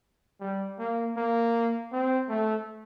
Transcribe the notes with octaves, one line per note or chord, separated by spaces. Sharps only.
G3
A#3
A#3
C4
A3